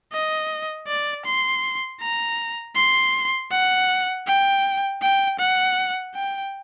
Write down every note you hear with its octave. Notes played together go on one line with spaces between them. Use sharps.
D#5
D5
C6
A#5
C6
F#5
G5
G5
F#5
G5